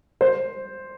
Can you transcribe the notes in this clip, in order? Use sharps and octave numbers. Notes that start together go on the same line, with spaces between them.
C5